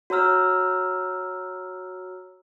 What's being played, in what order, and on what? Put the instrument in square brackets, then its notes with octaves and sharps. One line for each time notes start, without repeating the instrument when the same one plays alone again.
[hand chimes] F#4 C#5 A#5 E6 F6